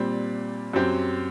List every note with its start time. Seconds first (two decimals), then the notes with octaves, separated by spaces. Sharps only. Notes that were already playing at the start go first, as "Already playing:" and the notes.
Already playing: A#2 G3 C4
0.73 F#2 F#3 C4 G4